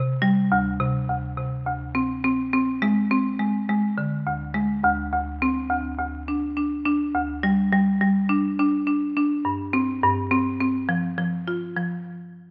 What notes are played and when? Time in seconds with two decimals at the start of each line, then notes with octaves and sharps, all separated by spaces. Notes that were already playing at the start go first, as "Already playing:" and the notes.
Already playing: C3
0.22 G3
0.52 D2
0.80 C3
1.09 D2
1.38 C3
1.66 D2
1.95 C4
2.24 C4
2.53 C4
2.82 G#3
3.11 C4
3.39 G#3
3.69 G#3
3.98 D3
4.27 D2
4.54 G#3
4.83 D2
5.13 D2
5.42 C4
5.70 D2
5.99 D2
6.28 D4
6.57 D4
6.86 D4
7.15 D2
7.43 G3
7.72 G3
8.01 G3
8.29 D4
8.59 D4
8.87 D4
9.17 D4
9.45 G2
9.73 C4
10.03 G2
10.31 C4
10.61 C4
10.89 F3
11.18 F3
11.48 F4
11.76 F3